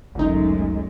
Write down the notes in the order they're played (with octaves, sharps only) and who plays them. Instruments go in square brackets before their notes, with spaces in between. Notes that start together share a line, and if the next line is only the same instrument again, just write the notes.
[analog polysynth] G1 C#2 D#4 [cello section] F#2 G#3 A3